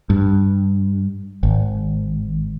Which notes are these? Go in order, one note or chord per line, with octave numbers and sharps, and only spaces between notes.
G2
G#1